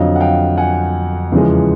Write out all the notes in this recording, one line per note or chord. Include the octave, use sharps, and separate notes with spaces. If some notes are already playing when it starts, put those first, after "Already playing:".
Already playing: F2 D3 F#3 D#5 F5
F#5
F5 G5
F#5 G#5
E2 C#3 F3 G#3